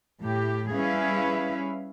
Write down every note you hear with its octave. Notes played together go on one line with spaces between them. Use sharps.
A2 G4
G3 C#4 E4 G#4 B4 F5